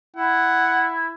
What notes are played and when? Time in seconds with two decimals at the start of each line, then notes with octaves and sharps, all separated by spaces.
0.16 E4 F#5